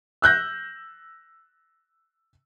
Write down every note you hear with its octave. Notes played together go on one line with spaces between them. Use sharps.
E6 F#6 G6 A#6